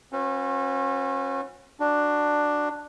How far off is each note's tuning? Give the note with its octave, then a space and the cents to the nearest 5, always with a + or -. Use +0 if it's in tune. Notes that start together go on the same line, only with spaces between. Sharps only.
C#4 -35 F#4 -40 B4 +25
D4 +10 F#4 +5